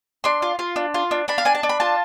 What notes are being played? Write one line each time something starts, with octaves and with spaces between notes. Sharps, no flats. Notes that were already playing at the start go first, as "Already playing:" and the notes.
D4 C6
F4
F4
D4
F4
D4
D4 B5
F5
D4 G#5
A5
D4
B5
F4 A5